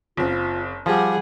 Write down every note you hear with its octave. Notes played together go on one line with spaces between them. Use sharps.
F#1 C4 F4
F3 G3 G4 G#4 F#5